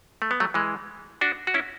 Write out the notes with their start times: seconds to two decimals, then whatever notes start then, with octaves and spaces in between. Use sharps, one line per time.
0.22 A3
0.31 B3
0.40 F#3 A3
0.54 E3 G#3
1.21 D4 F#4
1.47 F#4
1.54 C#4 E4